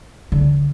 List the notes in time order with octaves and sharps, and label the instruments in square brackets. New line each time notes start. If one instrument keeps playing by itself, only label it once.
[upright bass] D3